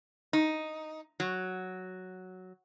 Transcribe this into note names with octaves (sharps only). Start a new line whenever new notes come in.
D#4
F#3